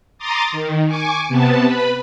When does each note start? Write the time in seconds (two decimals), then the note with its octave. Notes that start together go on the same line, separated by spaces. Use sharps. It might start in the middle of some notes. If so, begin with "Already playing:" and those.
0.18 A#5 C6 D6 D#6 A6
0.52 D#3
0.87 G#5 C#6 D6
1.28 C3 B3 A5
1.65 B4 B5